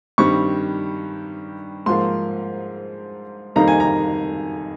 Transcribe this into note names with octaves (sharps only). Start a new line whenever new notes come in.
G2 D#3 G3 C4 C#6
G#2 F3 A#3 C6
F2 D#3 G3 A#3 D#4 A#5
G#5
A#5